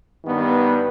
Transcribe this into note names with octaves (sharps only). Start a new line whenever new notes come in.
G2 D#3 B3